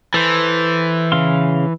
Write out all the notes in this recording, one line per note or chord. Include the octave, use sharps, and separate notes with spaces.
E3 A4 C5
C#3 F5 C6